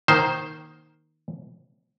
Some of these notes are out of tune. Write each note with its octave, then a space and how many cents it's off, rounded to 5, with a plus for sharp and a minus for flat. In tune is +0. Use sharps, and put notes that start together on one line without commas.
D#3 +0 A#3 +5 C5 +0